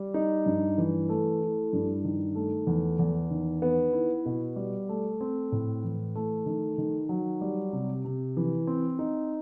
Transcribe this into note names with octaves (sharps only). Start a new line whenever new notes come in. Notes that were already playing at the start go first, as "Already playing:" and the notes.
Already playing: G3
D#4
G2
E3
A3
E4
G2
D#3
A3
E2
E2
D#3
B3
E4
B2
G3
A3
C4
A2
E3
A3
D#3
D#3
F#3
G3
C3
C3
E3
C4
D#4